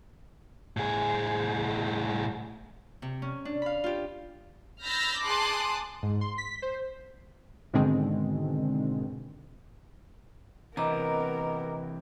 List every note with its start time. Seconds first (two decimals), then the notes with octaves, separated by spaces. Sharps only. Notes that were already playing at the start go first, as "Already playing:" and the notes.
0.77 A2 G#4
3.02 C3
3.22 C#4
3.45 D4
3.62 F5 B5
3.84 F4 G4
4.84 B5 E6 F6 G6 A6 A#6
5.22 G#4 A5 C6 D6 D#6 F#6
6.03 G#2
6.21 C6
6.38 B6
6.62 C5
7.73 G#2 B2 D3 D#3 G#3 C4
10.77 C3 E3 B3 C4 A#4 D#5 A#5 D6